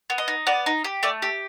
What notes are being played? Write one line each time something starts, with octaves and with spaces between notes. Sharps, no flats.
B3
D#5
D#4
B3 D5
D#4
G4
A3 D5
G4